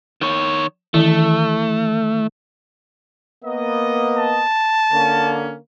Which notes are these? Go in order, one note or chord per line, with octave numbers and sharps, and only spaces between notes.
D#3 C#5
D#3 E3 A3 E4
A#3 B3 D#5
A5
D3 A#3 C#4